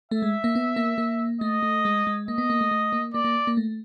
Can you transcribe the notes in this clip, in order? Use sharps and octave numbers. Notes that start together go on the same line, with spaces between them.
A3 E5
G#3
A#3
B3
A#3
A#3
A3 D#5
A3
G#3
G#3
A#3 D#5
B3
A#3
A3
A3
A#3
A#3 D5
A#3
A#3
A3